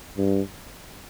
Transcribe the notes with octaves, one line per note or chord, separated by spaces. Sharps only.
G2